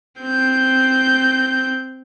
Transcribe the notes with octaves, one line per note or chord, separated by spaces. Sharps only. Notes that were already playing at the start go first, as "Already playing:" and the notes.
C4 G6